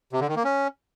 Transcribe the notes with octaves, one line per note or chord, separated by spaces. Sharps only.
C3
D3
D#3
A#3
C#4